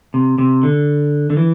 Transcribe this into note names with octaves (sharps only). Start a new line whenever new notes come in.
C3
C3
D3
D3
E3